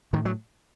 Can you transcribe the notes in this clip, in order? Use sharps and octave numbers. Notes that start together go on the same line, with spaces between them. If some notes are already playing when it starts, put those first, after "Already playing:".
A2 D#3
F#3